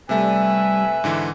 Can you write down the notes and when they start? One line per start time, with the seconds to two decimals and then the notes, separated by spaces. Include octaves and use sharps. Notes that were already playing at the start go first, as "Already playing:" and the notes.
0.09 C3 G3 A3 B4 E5 G#5
1.04 G#2 D3 E3